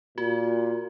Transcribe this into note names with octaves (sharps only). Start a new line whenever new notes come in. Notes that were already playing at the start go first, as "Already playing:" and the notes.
A#2 F#4